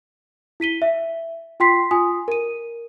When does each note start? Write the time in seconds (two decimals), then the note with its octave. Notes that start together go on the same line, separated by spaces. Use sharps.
0.60 E4 B6 D#7 G7
0.82 E5
1.60 F4 G5 C6 B6 C7
1.91 F4 G#5 D#6
2.28 A#4 D#7